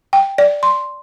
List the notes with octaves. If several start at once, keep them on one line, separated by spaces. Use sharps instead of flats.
G5
D5
C6